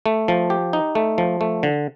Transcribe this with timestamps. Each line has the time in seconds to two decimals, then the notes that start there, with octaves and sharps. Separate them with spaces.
0.06 A3
0.28 F3
0.50 G4
0.73 D#4
0.95 A3
1.18 F3
1.41 A3
1.63 D3